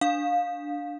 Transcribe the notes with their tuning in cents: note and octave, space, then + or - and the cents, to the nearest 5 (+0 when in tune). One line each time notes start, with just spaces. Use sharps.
D4 +0 F5 +20